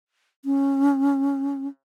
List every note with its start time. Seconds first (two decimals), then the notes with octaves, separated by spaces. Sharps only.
0.45 C#4